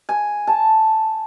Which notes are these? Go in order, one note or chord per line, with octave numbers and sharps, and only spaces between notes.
G#5
A5